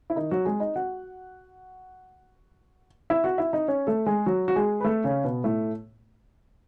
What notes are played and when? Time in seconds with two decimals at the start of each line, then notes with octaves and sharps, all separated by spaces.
0.10 E4
0.16 D#3 D#4
0.31 F#3 F#4
0.45 G#3 G#4
0.60 D#4 D#5
0.76 F#4 F#5
3.10 E4 E5
3.24 F#4 F#5
3.38 E4 E5
3.53 D#4 D#5
3.68 C#4 C#5
3.87 A3 A4
4.06 G#3 G#4
4.26 F#3 F#4
4.48 F#4
4.56 G#3 G#4
4.81 B4
4.84 A3 A4
5.04 C#3 C#4
5.24 B2 B3
5.44 A2 A3